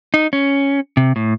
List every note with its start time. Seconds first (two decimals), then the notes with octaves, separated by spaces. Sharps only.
0.14 D#4
0.33 C#4
0.97 C3
1.16 A2